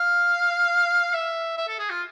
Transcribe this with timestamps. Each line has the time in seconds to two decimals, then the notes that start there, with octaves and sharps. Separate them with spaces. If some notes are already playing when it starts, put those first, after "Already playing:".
Already playing: F5
1.14 E5
1.57 E5
1.68 A4
1.79 G#4
1.90 F4